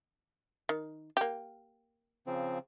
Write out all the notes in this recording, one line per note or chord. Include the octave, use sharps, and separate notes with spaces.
D#3
A#3 G4
C#3 F3 C4